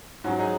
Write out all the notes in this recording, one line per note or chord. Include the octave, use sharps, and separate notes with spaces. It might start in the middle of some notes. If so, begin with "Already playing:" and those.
G#2 F#3 C#4 F#4
D#4 G#4